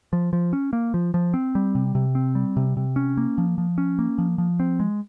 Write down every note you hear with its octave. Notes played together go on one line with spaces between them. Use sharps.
F3
F3
C#4
A#3
F3
F3
C4
G3
C3
C3
C4
G3
C3
C3
C#4
A#3
F3
F3
C#4
A#3
F3
F3
C4
G#3